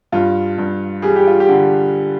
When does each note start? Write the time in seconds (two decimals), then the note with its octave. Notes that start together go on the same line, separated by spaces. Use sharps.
0.12 G2 F4
0.58 G2
1.02 G3 G#4
1.16 G4
1.27 F4
1.40 G4
1.48 D3